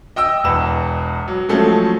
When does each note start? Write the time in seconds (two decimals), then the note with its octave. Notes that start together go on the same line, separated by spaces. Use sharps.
0.16 D#5 G5 D#6 E6
0.44 E1 E2 B4 E7
1.28 F#3
1.49 F3 F#3 G#3 A3 C4 C#4